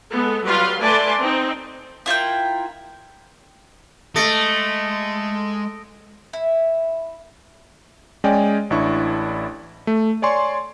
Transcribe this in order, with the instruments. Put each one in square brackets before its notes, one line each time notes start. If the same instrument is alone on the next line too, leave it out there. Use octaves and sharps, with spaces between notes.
[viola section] G#3 B3 A4
F#3 G3 F4 B4 F5 C6
A3 B4 D5 G#5 A5 C6
C4 D#4
[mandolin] E4 F4 A#4 G5
[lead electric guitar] G#3 D#5 [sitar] A3 [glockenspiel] D#6 A#6 D7
[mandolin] E4
[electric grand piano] G#3 C#4 D5 D#5 G5 G#5
A1 D4 E4 C#6
A3
C#5 D5 G#5 C6 C#6